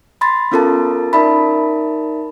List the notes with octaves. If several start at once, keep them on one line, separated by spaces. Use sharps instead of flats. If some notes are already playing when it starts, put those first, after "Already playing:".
B5 C6 A6
B3 C#4 F4 A4 A#4 A5
D#4 A#4 D5 E5 A5 B5